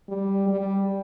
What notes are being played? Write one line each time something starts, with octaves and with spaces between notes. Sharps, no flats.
G3
G3